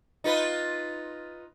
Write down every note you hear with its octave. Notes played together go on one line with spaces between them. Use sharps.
D#4 F4 B4